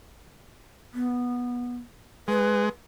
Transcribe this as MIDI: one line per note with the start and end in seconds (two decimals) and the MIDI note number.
0.94 1.75 59
2.28 2.69 56
2.28 2.66 71